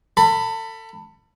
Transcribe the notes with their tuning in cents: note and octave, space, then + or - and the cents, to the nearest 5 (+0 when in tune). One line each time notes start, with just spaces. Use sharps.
A4 +30 B5 +0